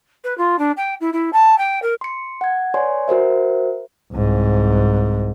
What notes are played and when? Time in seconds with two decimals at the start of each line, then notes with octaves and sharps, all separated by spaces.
0.24 B4
0.37 F4
0.58 D4
0.76 G5
1.00 E4
1.12 E4
1.33 A5
1.58 G5
1.82 A#4
2.01 C6 C#7
2.41 F#5 G#6
2.74 B4 C#5 D5 G#5 C6
3.08 F#4 A#4 C5 E5
4.13 C2 G#2